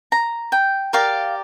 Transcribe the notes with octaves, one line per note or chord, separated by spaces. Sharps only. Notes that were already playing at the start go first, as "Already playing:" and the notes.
A#5
G5
G4 A#4 D5 F5